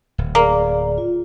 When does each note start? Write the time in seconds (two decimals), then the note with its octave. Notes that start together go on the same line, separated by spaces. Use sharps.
0.18 D1
0.35 A#3 G#4 D5
0.98 F4